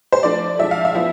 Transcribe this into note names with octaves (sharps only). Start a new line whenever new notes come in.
C5
F3 A3 D4 D5
F3 G#3 D4 E5
F5
E5
F3 B3 E4